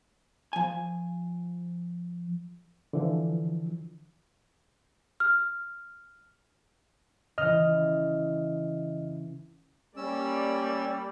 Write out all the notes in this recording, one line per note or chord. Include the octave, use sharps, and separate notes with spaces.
F3 G#5
D3 E3 F3
F6
C#3 E3 D#5 F6
G3 A#3 C#4 D5 E6